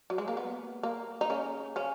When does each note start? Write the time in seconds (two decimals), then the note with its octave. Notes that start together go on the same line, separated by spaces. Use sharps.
0.10 F#3
0.18 G#3
0.28 A#3
0.37 B3
0.83 A#3
1.21 D#4
1.30 C#3 C#4
1.76 C#3 C#4